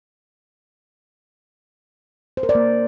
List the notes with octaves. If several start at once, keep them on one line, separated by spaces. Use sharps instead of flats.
C5
A#4
D5
A#3